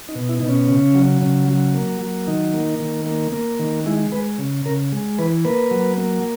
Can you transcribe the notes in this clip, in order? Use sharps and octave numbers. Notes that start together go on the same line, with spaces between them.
D#4
B2
E4
B2 D#4
C#4
C#3
F#3
C#3
F#3
A#3
F#3
D#3 D#4
A#3
D#3
A#3
A#3
D#3
G#3 E4
G#3 B4
C#3
C#3 A#4
G#3
E3 B4
A#3 B4
F#3
A#3